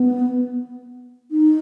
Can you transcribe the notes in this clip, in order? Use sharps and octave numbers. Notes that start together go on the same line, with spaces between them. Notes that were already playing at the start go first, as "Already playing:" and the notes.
Already playing: B3
D#4